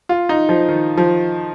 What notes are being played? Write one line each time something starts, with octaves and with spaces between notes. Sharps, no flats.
F4
D#4
F3
D#3
F3